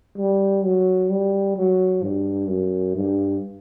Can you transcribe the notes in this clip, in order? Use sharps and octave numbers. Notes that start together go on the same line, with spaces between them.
G3
F#3
G3
F#3
G2
F#2
G2